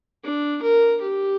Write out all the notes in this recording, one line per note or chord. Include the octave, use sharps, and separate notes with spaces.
D4
A#4
G4